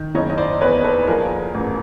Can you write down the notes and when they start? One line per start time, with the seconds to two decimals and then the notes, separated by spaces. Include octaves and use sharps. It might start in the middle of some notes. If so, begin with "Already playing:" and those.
Already playing: D#3
0.15 F#1 C#5 D#5
0.30 D#5
0.38 C5 D5
0.61 E2 B4 C#5
0.84 A4 B4
1.07 F3 G#4 A#4
1.54 A1